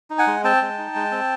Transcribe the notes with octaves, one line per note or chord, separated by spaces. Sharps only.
D#4
F#5 G#5
G#3
C4 G5 A5
G#3
D#4
G#3
C4